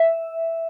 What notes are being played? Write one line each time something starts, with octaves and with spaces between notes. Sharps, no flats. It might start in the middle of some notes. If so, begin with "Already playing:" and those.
Already playing: E5